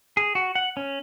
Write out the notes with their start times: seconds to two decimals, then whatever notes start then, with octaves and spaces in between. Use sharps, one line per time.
0.17 G#4
0.35 F#4
0.55 F#5
0.77 C#4